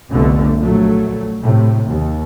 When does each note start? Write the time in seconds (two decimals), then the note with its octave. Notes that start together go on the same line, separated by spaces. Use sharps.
0.11 F1 C2 D3 A3 B3
0.61 A#1 F#3 A3
1.41 A2 C3
1.89 D#2